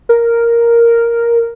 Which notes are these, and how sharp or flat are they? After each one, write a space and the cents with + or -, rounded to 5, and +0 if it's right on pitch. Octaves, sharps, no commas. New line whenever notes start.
A#4 +0